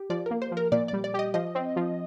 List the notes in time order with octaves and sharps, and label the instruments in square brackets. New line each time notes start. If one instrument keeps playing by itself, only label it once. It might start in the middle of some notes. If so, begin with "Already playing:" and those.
Already playing: [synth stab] G4
[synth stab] F3 [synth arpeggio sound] D5
[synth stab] A#3 [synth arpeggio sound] A#4
[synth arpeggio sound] C5
[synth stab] F3
[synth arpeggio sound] A#4
[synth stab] A#2 [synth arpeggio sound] D5
[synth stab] G3 [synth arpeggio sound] D5
[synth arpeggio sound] D5
[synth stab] G4
[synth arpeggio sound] D#5
[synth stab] F3 [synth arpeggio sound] D#5
[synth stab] C4
F3